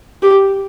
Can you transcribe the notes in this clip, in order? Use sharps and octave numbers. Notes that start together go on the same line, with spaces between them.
G4